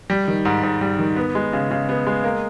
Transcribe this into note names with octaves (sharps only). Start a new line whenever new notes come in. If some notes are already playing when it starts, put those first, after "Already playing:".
G3
D#3
G#2
G#2
G3
D#3
B3
G#3
C#3
C#3
B3
G#3
A#3